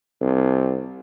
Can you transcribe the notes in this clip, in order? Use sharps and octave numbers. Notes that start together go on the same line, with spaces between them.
C2